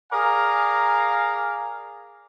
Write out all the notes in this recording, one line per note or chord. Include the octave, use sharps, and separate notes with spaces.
G#4 A#4 D5 F5 G#5 A#5